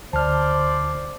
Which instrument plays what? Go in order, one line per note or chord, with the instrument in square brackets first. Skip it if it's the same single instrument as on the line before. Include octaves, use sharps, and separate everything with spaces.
[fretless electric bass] D2 [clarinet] C5 [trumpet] D5 [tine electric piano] A5 F6